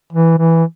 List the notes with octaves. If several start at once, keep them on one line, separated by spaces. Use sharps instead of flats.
E3
E3